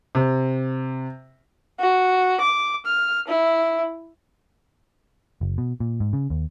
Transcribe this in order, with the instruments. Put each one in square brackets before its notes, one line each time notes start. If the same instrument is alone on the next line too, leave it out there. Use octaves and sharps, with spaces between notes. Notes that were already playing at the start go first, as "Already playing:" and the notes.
[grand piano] C3
[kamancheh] F#4
D6
F6
E4
[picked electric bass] F#1
B2
A#2
G#2
C#3
D#2